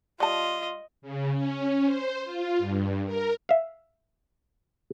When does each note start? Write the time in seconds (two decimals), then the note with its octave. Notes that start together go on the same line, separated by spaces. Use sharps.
0.20 G3 F4 D#5 A5
1.02 C#3
1.33 C#4
1.85 C5
2.24 F4
2.58 G2
3.05 A#4
3.49 E5 F5